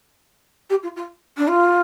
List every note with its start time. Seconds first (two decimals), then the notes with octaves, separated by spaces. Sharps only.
0.70 G4
0.83 F4
0.96 F4
1.37 D4
1.49 F4